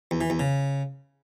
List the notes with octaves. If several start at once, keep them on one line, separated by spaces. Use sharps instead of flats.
E2
E3
E2
C#3